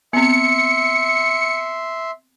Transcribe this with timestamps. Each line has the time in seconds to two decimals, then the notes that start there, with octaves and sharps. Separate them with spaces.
0.13 B3 C4 E5 C6 C#7